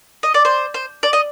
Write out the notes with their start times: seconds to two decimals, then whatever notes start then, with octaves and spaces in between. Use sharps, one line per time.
0.23 D#5
0.34 D5
0.45 C5
0.74 C5
1.03 D5
1.13 D#5